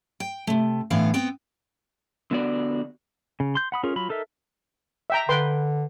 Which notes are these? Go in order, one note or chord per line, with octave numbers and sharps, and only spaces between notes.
G5
C3 A3
A2 D3 E3 B3 F5
B3 C4 G5
D3 B3 F#4 D5
C#3
C6 G6
F#5 B5 D#6
C#4 F4 G#4 A#4
F#3 F4 B5
D#4 A4 A#4 E5
E5 G5 A#5
D3 B4 G5 C6